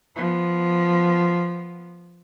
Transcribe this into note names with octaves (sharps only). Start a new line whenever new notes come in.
F3 B3